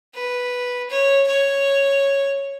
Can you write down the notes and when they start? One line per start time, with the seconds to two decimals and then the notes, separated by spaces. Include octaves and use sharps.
0.15 B4
0.90 C#5
1.27 C#5